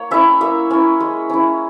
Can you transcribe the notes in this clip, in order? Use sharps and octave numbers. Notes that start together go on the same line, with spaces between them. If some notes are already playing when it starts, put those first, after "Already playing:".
Already playing: A#3 C#5
C#4 E4 E5
A#3 E5
C#4 E4
G#3
C#4 E4